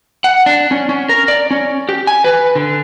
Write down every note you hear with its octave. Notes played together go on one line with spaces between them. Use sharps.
F#5
D4
C#4
C#4
A#4
D5
C#4
G4
G#5
B4
D3